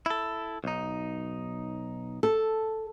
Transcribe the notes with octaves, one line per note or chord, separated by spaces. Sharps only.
E4 A4
B1 D#4
A4